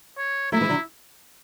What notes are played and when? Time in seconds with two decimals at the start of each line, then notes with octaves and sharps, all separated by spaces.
0.18 C#5
0.52 F#3 A3 E4
0.61 E3 G#3
0.69 D3 F#3